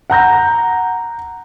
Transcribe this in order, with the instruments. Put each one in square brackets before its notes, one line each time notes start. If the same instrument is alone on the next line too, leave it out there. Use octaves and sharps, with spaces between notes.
[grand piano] F#5 A#5 G6 A#6